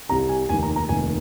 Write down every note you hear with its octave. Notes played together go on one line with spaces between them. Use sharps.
C2 C3 G3 A#5
G#5
F1 D#2 D#3 G#5
A#5
A#5
F1 D#2 D#3 G#5